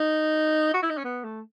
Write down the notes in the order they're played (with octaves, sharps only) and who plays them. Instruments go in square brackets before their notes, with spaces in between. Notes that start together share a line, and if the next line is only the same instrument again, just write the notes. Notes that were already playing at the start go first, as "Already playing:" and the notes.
Already playing: [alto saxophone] D#4
F#4
E4
D#4
C#4
B3
A3